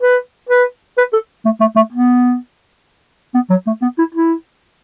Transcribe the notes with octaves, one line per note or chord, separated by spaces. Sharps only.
B4
B4
B4
A4
A3
A3
A3
B3
B3
F#3
A3
B3
E4
E4